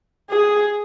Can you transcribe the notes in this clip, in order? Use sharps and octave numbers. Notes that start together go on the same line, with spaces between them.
G#4